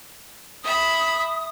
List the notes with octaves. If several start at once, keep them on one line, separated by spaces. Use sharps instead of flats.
E5 B5 D#6